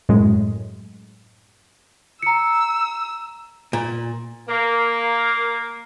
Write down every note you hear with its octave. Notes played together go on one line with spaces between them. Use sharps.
F#2 A2 G#3
A#5 E6 C#7
A#2
A#3